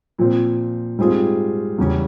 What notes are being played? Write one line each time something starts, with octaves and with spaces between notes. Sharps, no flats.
A#2 F3 C4
G#2 G3 C4 F4 G#4
E2 C#3 G3 C#4